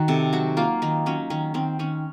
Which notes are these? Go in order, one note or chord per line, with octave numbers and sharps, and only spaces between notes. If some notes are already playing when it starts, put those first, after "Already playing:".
Already playing: D#3 D#4 F#4
C3 A4
F#3 F#4
A#3 F4
D#3 D#4
F#3 C#4
D#3 C#4
D#3 C4
D#3 C#4